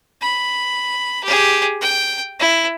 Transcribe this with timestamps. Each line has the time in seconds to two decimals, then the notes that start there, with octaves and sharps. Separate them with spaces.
0.21 B5
1.23 G4 G#4
1.81 G5
2.39 E4